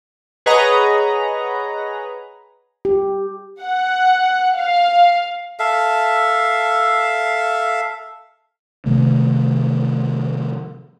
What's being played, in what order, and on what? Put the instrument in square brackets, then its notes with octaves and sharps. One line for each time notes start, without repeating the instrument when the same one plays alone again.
[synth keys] G#4 B4 C#5 D#5 F#5 A#5
[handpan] G4
[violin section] F#5
F5
[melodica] A4 E5 F5
[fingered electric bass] C3 D#3 F3 A3